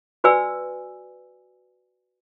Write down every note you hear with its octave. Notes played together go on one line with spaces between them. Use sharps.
F#4 B4 D5 G#5 E6